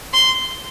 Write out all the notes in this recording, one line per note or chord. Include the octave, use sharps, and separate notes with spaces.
C6